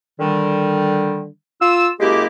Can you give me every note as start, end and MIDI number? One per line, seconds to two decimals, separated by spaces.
0.20 1.27 50
0.20 1.27 51
0.20 1.27 55
1.61 1.90 65
1.61 1.90 88
2.00 2.27 42
2.00 2.27 56
2.00 2.27 58
2.00 2.27 64
2.00 2.27 67